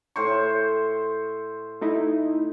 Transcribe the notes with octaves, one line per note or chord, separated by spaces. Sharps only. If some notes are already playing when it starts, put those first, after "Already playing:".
A2 C5 C#6
A3 D#4 E4